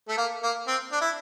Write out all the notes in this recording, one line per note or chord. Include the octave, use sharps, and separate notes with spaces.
A3
A#3
A#3
C4
D4
E4